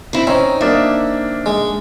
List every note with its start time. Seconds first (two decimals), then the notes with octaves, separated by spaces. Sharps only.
0.13 C4 E4
0.27 C4 C#4 D#4
0.61 A#3 D4 D#4 E5
1.46 G#3